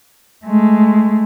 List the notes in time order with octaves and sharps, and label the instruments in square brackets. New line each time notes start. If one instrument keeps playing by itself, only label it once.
[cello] G#3 A3